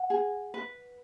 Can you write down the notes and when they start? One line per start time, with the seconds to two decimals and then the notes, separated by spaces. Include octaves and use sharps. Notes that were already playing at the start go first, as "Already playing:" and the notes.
Already playing: F#5
0.10 G#4
0.54 B4